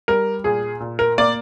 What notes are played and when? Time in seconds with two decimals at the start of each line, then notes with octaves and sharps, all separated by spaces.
0.08 G3 A#4
0.44 A#2 G#4
0.80 A#2
0.99 A#4
1.18 A#3 D5